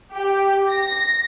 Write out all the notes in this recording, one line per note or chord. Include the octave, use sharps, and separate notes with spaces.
G4
A#6